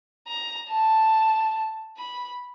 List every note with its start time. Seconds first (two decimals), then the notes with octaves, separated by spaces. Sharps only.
0.28 A#5
0.70 A5
1.98 B5